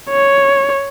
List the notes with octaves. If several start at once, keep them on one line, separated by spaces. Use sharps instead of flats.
C#5